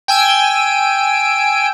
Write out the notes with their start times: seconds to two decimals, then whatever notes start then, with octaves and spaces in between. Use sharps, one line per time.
0.08 G5 G#5 E6 D7